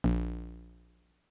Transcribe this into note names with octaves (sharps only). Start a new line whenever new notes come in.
A#1